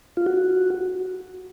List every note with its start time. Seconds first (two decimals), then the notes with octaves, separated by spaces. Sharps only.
0.17 F4
0.26 F#4